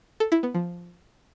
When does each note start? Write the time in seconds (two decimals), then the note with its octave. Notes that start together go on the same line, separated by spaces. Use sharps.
0.20 A4
0.32 E4
0.43 B3
0.54 F3